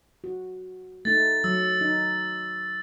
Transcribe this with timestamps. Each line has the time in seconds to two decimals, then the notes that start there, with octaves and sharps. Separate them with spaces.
0.24 F#4
1.05 A3 D#4 A6
1.44 F#3 E6
1.81 D#4